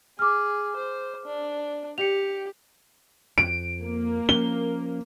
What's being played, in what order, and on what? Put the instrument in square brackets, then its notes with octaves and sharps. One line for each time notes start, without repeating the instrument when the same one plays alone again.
[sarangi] G#4 [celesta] D6 F6
[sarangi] C5
D4
[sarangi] G4 [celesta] C#7 F7
[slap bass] F2 [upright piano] D7
[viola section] A#3
[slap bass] F3 C#4 [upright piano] G7